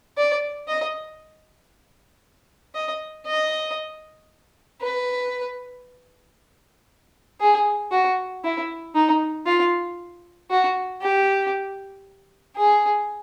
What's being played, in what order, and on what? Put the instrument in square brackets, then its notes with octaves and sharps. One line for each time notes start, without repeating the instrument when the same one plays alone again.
[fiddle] D5
D#5
D#5
D#5
B4
G#4
F#4
E4
D#4
F4
F#4
G4
G#4